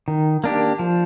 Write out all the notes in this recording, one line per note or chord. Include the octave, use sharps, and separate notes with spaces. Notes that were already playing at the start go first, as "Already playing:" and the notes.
D#3
A#3 D4 G4
F3